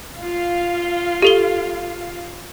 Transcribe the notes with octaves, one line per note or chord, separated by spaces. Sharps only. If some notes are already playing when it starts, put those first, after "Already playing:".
F4 F5
G4 A4 G7